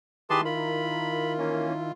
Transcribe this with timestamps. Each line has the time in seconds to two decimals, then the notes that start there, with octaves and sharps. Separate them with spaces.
0.30 D#3 E4 G4 G#4 B4 A5 C6
0.45 F4 A#4 B5
1.38 E3 A#3 C#4